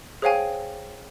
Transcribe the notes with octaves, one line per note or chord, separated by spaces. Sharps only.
G#4 C5 C#5 F5 G5 G#5